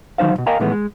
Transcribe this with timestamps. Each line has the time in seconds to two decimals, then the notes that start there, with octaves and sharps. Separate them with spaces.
0.18 D#3 F#3 D#4 C5 F5
0.34 B1 B2
0.47 A#4 D#5 F5 G5 G#5 A#5
0.59 A2 D#3 E3 G#3 A3 B3
0.72 G#3